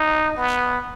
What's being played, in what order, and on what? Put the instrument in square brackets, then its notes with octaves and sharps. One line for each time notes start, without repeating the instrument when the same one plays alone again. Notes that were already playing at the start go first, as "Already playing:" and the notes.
Already playing: [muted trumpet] D#4
B3